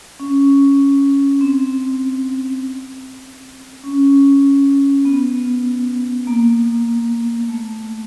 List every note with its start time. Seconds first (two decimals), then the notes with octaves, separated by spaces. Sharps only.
0.20 C#4
1.41 C4
3.84 C#4
5.05 B3
6.27 A#3
7.48 A3